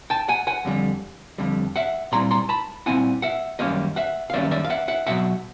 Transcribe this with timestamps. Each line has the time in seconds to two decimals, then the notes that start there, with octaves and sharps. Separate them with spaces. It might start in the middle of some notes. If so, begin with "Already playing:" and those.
0.10 G5 A5
0.29 F#5 G#5
0.47 F#5 G#5
0.65 F2 D3 G3
1.38 F2 D3 G3
1.76 E5 F#5
2.12 A#2 G3 C4 E4 A#5 C6
2.31 A#5 C6
2.49 A5 B5
2.86 A#2 G3 C4 E4 F#5 G#5
3.22 E5 F#5
3.59 F#2 D#3 G3 A#3 C#4 D#5 F5
3.96 E5 F#5
4.30 F5
4.33 F#2 D#3 G3 A#3 C#4 D5 E5
4.51 D5 E5
4.65 F5
4.70 E5 F#5
4.88 E5 F#5
5.07 E2 B2 F#3 E5 F#5